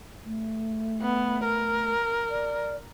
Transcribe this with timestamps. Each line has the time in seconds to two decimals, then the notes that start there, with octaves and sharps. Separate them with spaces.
0.25 A3
1.02 B3
1.44 A#4
2.30 D5